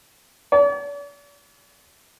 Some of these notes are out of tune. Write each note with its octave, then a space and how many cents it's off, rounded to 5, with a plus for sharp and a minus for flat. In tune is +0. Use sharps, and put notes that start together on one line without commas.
D5 -45